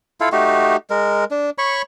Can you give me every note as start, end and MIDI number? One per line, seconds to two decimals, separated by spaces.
0.21 0.29 64
0.21 0.29 65
0.21 0.29 69
0.21 0.29 77
0.32 0.76 57
0.32 0.76 63
0.32 0.76 66
0.32 0.76 67
0.90 1.24 56
0.90 1.24 70
1.31 1.50 62
1.58 1.82 73
1.58 1.82 83
1.58 1.82 85